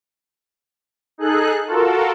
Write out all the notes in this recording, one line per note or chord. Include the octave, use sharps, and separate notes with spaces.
D#4 G#4 A4 F#6
F4 F#4 A4 A#4